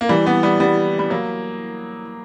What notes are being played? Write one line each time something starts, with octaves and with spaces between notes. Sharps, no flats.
A#3
E3 G3
G3 B3
G3 B3
G3 B3
G3
F#3 A#3